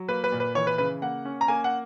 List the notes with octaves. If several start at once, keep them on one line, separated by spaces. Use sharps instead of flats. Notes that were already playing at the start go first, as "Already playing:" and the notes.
Already playing: F#3
A#3 B4
B4
A#2
B4
E3 C#5
B4
C#3 B4
A#3 F#5
C#4
A#5
A#3 G#5
F#5